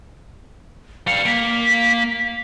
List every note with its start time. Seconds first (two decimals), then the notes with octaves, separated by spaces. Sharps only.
1.07 G3 F5 C#7
1.25 A#3 B6